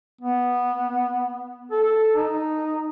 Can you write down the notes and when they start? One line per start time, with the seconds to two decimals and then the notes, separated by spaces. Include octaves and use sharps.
0.21 B3
1.71 A4
2.15 D#4